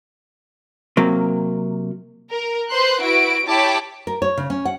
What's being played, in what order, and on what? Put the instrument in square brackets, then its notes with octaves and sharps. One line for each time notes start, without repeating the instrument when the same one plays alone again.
[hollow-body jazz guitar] C3 F#3 A#3
[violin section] A#4
B4 C5 C6 F#6
E4 F#4 B4 D7
E4 G4 C#5 A5 B5 D6
[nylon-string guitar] A#4
C#5
C#3
C#4
F#5